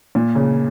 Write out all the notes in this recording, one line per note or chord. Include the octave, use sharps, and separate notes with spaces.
A#2
C#3